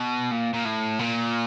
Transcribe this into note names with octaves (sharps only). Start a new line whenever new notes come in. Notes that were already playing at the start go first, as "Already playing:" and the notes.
Already playing: B2
A#2
A#2
A2
A#2